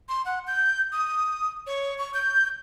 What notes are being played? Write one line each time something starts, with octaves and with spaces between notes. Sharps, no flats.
C6
F#5
G6
D#6
C#5
C#6
G6